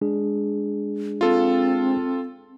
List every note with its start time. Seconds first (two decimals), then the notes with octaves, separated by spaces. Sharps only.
0.01 G#3 D4 G#4
1.21 C4 F4 A4